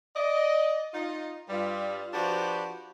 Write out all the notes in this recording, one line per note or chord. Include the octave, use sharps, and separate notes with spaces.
D5 D#5
D#4 F4
G2 G3 F4
F3 D4 F#4 G4 B4 C5